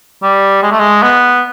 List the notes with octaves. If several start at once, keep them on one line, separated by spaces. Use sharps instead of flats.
G3
G#3
A3
G#3
B3